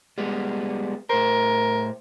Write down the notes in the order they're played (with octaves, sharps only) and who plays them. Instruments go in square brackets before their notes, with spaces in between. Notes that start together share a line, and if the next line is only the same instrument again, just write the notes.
[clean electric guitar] G3 G#3 B3
[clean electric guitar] A2 C5 [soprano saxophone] A#4